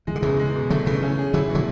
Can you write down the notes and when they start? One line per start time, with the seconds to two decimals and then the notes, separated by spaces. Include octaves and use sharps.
0.07 E3 G#3
0.15 D3
0.22 E2 C#3 E3
0.39 G#3
0.55 B2
0.70 D3 F#3 A3
0.86 C#3 E3 A3
1.03 C#4
1.18 G#4
1.33 D3 F#3 E4
1.49 B2
1.55 D3 F#3